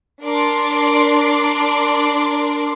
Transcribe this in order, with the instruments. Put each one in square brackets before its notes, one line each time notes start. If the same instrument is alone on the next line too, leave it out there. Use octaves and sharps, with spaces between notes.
[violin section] D4 A#4 D5 C6 D6